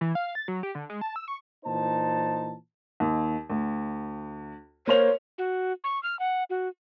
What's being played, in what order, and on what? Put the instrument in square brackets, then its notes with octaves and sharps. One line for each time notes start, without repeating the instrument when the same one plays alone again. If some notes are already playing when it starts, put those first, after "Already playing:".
[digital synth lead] E3
F5
A6
F#3
G4
D3
G#3
A5
E6
C#6
[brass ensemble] A#2 E3 D#4 C5 A5
[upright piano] D#2
D2
[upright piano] A#3 C5 F7 [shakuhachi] C#5
[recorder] F#4
C#6
F6
F#5
F#4